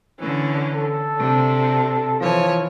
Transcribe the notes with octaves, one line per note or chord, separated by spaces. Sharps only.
D3 E3 C#4
A4
C3 D4
E3 F3 C#5 G#5